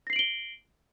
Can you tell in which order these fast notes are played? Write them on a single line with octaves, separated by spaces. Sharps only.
A#6 C7 F#7 D7 G7